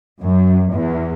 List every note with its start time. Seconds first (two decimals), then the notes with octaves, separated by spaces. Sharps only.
0.21 F#2
0.72 E2